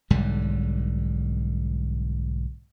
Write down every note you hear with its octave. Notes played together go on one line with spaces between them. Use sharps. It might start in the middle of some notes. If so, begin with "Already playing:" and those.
B1 G#2 D3 G3